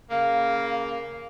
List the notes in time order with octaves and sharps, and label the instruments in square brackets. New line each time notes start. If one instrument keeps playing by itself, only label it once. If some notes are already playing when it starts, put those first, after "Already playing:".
[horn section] C#3 A#3 [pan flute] F5